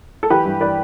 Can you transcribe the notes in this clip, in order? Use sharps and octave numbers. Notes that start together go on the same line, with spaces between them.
A4
E3 G4 B4
G2
E3 B4 D5